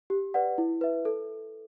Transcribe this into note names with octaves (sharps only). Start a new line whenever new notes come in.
G4
B4 D5 F#5
E4
B4 E5
A4